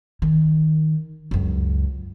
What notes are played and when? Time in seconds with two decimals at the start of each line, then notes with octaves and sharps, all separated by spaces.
0.22 D#3
1.31 C#2 F#2